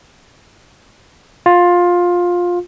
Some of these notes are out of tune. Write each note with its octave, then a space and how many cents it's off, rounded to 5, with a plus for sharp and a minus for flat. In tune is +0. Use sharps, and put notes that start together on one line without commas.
F4 +15